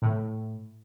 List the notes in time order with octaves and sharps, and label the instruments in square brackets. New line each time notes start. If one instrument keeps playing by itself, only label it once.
[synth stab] A2